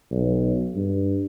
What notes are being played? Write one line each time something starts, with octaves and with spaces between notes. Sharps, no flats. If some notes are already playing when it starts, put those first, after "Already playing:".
B1
G2